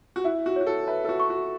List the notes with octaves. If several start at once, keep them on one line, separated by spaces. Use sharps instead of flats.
F#4
E4 E5
F#4
F#4 C#5
A4
B4 E5
A4
F#4
C#6
F#4